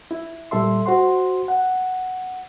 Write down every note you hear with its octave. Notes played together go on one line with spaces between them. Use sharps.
E4
A#2 G3 A4 E5 C6
F#4 C5 F#5 C6
F#5